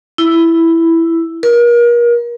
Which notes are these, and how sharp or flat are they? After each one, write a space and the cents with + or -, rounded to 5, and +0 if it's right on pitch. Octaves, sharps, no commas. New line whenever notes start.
E4 +5
A#4 +35